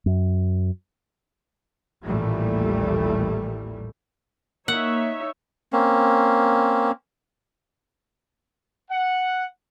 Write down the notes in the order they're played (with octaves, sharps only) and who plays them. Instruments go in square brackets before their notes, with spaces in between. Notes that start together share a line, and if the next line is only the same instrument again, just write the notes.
[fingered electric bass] F#2
[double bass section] A1 D#2 A#2 E3 G3 A3
[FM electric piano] A#3 [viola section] D#4 C#5 E5 [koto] F#5
[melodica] A#3 C4 C#4
[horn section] F#5